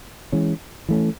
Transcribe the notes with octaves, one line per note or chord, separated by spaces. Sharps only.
E3 G#3 C#4
E3 A3 C#4